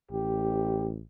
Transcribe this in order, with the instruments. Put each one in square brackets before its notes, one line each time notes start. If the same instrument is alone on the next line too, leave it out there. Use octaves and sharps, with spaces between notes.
[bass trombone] A1 [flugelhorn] G4